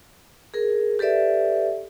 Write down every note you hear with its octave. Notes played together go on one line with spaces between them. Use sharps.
G#4 A#4
G4 A4 B4 D5 E5